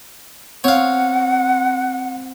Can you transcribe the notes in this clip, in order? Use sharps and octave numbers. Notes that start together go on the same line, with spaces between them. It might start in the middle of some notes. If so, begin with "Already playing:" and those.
C4 C#5 F5 F#5